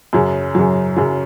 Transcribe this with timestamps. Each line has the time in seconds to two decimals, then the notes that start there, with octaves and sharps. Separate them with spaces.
0.13 F#2 C#3 F#3
0.55 F#2 C#3 F#3
0.96 F#2 C#3 F#3